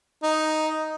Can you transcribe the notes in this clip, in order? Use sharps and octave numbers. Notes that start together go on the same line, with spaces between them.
D#4